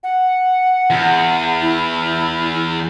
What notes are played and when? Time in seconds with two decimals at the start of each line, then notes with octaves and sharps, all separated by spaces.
0.03 F#5
0.90 E2
1.62 E4